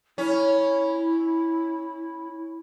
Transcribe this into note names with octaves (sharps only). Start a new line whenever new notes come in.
C#4 E4